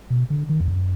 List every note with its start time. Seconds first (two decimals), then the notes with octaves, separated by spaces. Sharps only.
0.10 B2
0.30 D3
0.49 D#3
0.60 F2
0.68 F#2